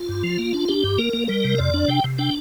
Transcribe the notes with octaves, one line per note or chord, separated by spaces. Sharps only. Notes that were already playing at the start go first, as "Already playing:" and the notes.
Already playing: F4
G2
F3
A#3
D4
D4 G4
G2
A#3 A#4
A#3
G3 A#4
C3
F2 D5
D4
C3 G5
C3
D4 G5